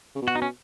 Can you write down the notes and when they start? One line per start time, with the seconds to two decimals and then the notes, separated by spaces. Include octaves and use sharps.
0.15 C#3
0.22 B2
0.28 F#4
0.35 D#4
0.42 C#4